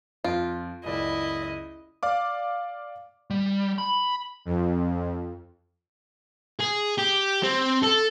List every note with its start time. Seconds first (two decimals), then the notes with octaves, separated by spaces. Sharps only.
0.24 F2 F4 D7
0.85 F#1 C#2 E4 D5 D#5
2.03 D5 F5 D6
3.30 G3
3.78 B5
4.45 F2
6.60 G#4
6.98 G4
7.43 C4
7.82 A4